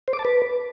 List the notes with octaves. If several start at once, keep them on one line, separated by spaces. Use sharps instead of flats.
C5
D6
A5
B4